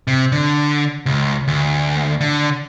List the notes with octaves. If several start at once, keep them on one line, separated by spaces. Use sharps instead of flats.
C3
D3
C#2
D2
D3